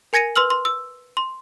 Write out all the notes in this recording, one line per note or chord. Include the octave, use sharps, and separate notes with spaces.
A#4 G#5 G#6 A#6 C#7 D#7
B4 C6 E6 F6 F#7
C6
E6
C6